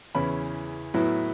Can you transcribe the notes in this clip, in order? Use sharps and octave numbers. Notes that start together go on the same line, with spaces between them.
E2 C#3 E3 C#4 E4 B5
A2 F#3 B3 E4